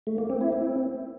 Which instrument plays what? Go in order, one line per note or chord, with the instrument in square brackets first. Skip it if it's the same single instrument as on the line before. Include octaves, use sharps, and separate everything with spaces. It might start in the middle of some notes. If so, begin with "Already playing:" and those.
[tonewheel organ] A3
A#3
C4
E4
C4